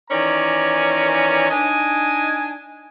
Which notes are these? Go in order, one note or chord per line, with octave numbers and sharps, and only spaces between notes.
D#3 E3 C#4 D5 G#5 A#5
D4 D#4 D#5 G#5